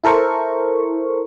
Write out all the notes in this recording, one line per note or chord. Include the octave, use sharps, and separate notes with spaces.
E4 A4 A#4 C5 C#6